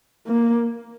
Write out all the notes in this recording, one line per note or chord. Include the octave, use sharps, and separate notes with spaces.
A#3